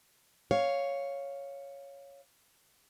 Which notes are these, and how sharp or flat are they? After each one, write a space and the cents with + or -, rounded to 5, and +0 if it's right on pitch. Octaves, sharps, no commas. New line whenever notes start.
C#5 +0 F5 +0